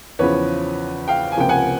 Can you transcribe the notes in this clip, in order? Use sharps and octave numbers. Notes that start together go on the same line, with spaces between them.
E2 C#3 F3 B4 C#5
F5 G5
G#5
C#2 C3 F3 A#3 G5
F#5 G#5